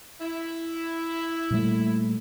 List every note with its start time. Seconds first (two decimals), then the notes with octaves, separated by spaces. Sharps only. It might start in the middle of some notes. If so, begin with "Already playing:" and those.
0.21 E4
1.51 A#2 G3 A3